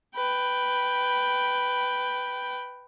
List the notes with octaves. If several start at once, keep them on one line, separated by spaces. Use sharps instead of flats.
B4 G5